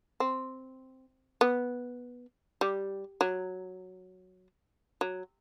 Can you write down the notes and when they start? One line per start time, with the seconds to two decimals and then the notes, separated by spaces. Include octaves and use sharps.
0.20 C4
1.41 B3
2.61 G3
3.21 F#3
5.01 F#3